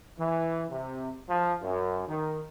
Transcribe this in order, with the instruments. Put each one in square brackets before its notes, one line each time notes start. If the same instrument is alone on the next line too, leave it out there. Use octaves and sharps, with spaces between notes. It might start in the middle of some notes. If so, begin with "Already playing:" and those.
[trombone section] E3
C3
F3
F#2
D#3